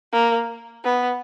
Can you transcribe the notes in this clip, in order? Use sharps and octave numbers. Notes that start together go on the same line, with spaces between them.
A#3
B3